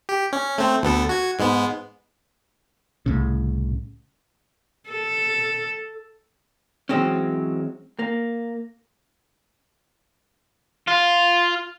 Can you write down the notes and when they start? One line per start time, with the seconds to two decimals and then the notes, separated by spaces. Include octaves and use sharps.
0.09 G4
0.33 C#4
0.58 A3 C4
0.83 D2 B3 A4
1.09 F#4 G#6
1.39 G#2 G#3 B3
3.06 C2 A2 C#3
4.90 A4
6.89 E3 F#3 G#3 C4 C#4
7.99 A#3
10.88 F4